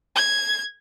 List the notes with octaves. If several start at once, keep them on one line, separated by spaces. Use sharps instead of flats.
G#6